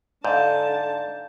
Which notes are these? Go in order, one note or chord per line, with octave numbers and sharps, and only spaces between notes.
G#2 D3 D5 E5 F5 A5 G6